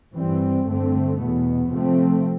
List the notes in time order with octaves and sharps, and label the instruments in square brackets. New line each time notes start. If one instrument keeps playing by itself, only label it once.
[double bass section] G2 E3 G3 C4
G2 D3 A3 C4
E2 B2 B3
C3 F3 A3 C4